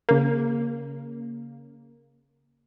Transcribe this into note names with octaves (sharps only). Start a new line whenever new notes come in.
C#3 A#3